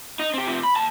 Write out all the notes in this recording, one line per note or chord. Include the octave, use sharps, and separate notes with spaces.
D#4
C4 G4
C3 F3
B5
D#2 A5